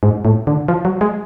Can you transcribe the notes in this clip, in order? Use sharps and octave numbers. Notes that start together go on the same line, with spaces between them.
G#2
A2
D3
F3
F#3
G#3